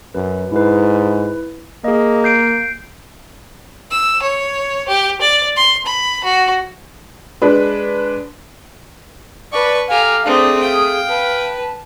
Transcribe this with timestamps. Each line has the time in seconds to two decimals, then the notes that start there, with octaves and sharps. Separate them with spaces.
0.15 F#2 B4
0.52 G#2 E4 B4
1.84 A#3 G#4 D#5
2.24 G6 C7 D7
3.91 E6
4.22 C#5
4.88 G4
5.21 D5
5.57 C6
5.86 B5
6.24 F#4
7.42 G#3 D4 B4
9.53 B4 D5 A5 C#6
9.90 G4 A4 F5 G#5 A#5
10.26 A3 C4 D4 G#4 D#6
10.61 F5 G5
11.09 B4 A5